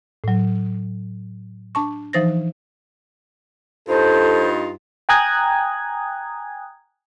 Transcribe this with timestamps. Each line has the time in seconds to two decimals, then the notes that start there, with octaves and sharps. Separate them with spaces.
0.24 A2 F#3
1.75 D4 A5 C#6
2.13 E3 F3 D#4 C5 A6 A#6
3.88 G2 D#4 F4 A4 C5
5.09 G5 G#5 A#5 D#6 F#6 G#6